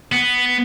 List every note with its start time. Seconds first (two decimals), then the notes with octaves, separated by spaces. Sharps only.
0.12 B3